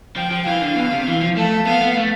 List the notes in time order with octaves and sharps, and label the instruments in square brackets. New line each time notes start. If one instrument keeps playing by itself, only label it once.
[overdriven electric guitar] F3 [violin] G5
[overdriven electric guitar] F3
[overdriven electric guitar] E3 [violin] F5
[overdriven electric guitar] D3
B2
C3
E3
F3
[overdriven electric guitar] A3 [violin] A4
[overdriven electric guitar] B3 [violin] F5
[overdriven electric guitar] B3
A3